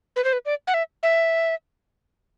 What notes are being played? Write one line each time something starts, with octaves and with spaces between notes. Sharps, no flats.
B4
C5
B4
D5
F#5
E5
E5